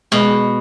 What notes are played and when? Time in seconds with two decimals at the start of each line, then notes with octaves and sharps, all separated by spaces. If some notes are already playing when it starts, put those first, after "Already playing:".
0.12 B2 G#3